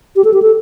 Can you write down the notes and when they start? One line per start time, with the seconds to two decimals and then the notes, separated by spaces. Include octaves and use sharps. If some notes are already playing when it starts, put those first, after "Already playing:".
0.16 G4
0.25 A4
0.34 G4
0.42 A4